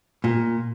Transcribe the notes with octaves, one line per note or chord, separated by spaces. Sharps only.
A#2